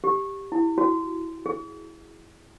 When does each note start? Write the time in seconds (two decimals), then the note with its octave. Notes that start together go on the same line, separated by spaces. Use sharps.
0.04 G4
0.52 E4
0.78 F#4
1.46 G#4